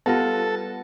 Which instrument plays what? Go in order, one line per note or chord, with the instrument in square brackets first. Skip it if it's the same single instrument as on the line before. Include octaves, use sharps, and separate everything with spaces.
[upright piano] G3 F4 [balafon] B3 [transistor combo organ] A4 [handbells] B4 F#5 A#6